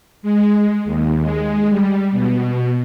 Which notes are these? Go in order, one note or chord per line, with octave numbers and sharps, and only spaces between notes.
G#3
D#2
G#3
G3
B2